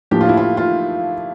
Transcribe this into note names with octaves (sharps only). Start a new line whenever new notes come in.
A2 F3 A#3 D4 G4
F4
E4
F4
F4